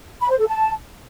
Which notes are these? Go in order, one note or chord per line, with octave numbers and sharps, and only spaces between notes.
B5
C5
A4
A5